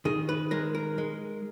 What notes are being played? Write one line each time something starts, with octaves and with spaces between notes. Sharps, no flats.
D#3 G#4
B4
G#3 A#4
A#4
G#3